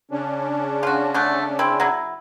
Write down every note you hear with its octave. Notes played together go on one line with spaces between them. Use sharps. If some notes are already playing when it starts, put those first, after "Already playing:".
C#3 C#4 D4
F4 F#4
D3 A3
C4 E4
F#3 E4